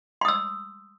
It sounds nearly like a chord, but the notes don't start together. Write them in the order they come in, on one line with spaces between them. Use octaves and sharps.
C6 D#6 E6